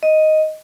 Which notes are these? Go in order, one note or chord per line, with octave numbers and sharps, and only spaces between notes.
D#5